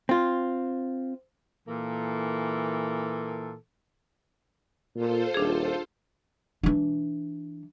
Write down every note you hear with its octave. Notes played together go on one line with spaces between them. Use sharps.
C4 F4
A#2 E3 A#3 A4
A#2 F4 A4 C5
D#1 D4 G#4
E3 D4